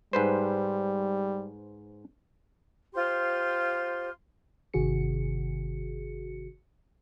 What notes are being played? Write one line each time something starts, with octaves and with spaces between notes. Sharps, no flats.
G#2 G3 B4 C5
F4 G4 C5 C6
G1 C3 D#3 F#4 G#4 C#7